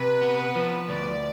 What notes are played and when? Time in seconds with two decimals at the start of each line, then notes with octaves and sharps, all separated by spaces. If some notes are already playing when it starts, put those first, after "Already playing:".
Already playing: C3 B4
0.21 B3
0.55 F3
0.89 D2 D5